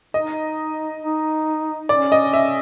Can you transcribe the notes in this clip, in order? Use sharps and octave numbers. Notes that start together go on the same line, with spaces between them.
D#4 D#5
D#4
C#4 D5
D#5
E5